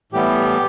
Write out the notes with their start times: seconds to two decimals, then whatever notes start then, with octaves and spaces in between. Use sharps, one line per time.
0.12 A2 E3 G3 B3 G4